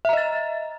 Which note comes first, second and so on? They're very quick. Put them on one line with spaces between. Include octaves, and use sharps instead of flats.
E5 A#5 D#5 A6